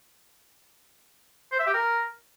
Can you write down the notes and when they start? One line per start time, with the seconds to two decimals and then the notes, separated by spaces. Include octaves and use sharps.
1.52 C5
1.60 E5
1.67 G4
1.74 A#4